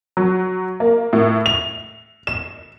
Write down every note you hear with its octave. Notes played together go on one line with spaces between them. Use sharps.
F#3
A#3
A2
F7
E7